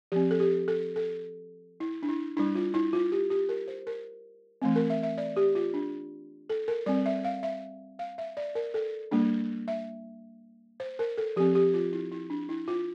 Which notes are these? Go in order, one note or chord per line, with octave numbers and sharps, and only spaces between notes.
F3 C4 G4
A4
G4
A4
A4
E4
D4
E4
G3 D4 E4
F4
E4
F4
G4
G4
A#4
C5
A#4
E3 A3 C4
A#4
E5
E5
D5
G4
F4
D4
A4
A#4
G3 C4 D5
E5
F5
E5
F5
E5
D5
A#4
A4
G3 A#3 D4
E5
C5
A#4
A4
F3 C4 G4
G4
F4
E4
E4
D4
E4
F4